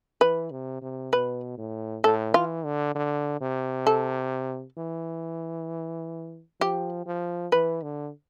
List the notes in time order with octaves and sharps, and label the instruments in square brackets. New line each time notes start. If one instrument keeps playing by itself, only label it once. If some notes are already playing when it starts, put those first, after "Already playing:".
[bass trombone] E3 [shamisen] B4
[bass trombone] C3
C3
[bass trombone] B2 [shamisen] B4
[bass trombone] A2
[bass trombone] A2 [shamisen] A4
[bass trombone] E3 [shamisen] F4
[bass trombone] D3
D3
C3
[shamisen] A4
[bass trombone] E3
[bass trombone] F3 [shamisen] G4
[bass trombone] F3
[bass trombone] E3 [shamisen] B4
[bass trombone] D3